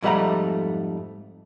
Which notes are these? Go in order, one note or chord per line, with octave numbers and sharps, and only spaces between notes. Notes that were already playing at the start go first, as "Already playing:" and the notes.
F2 G#2 G3 A3 F#5 A#5